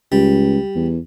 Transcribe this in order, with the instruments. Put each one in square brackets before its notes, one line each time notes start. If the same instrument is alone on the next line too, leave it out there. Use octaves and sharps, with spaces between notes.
[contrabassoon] C#2 [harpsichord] G3
[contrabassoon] E2